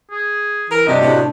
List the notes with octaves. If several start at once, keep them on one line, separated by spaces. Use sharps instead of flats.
G#4
E3 A#4
G2 C3 D4 F#4 G4 D#5
A2 C3